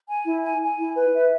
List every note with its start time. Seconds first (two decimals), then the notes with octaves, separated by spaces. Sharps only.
0.09 G#5
0.26 E4
0.44 G#5
0.62 G#5
0.78 E4
0.96 B4
1.14 E5